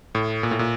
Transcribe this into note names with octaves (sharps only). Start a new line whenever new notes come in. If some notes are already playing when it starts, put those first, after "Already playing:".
A2
A#2
A2
A#2